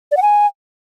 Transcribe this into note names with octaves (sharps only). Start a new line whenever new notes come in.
D5
F#5
G#5